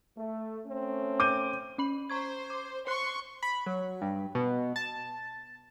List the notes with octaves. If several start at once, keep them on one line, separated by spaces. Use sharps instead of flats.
A3
A3 C4 C#4
D6 G6 D#7
C#4 B5 F#7
C5 A#5 C#6 G#6
D6
C5 C6 C#6 F#6
B5
F#3
G2
B2
A5